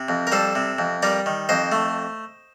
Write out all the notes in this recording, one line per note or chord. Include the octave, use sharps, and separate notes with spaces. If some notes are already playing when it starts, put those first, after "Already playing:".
Already playing: C3
F2
A#4
G3 A4 C5
C3
F2
G3 A#4 D5
D#3
F2 C5 D#5
A3